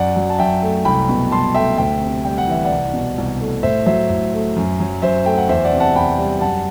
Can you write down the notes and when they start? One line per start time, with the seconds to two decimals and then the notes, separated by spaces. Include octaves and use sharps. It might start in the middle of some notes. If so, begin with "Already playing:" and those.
Already playing: F#2 D5 F#5
0.16 F#3
0.30 A5
0.39 F#2 E5 G5
0.62 A3
0.85 C2 G5 B5
1.09 B2
1.31 C2 A5 C6
1.55 A3 E5 G5
1.78 D2 E5 G5
2.01 C3
2.25 G3 G5
2.38 F#5
2.48 E3 E5
2.65 D5 F#5
2.71 C2
2.94 B2
3.18 C2
3.41 A3
3.63 A2 C5 E5
3.86 F#3 C5 E5
4.10 A2
4.33 A3
4.56 F#2
4.80 F#3
5.02 F#2 C5 E5
5.25 A3 G5
5.38 F#5
5.49 E2 C5 E5
5.64 D5 F#5
5.72 C3
5.80 F#5 A5
5.95 E2 G5 B5
6.18 G3
6.41 F#2 F#5 A5